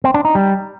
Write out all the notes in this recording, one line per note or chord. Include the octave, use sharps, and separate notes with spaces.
C4
D4
D#4
G3